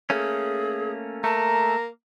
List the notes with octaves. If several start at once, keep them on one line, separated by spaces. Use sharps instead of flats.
A3 A#3 C#4 G#4
A3 A#3 A5 A#5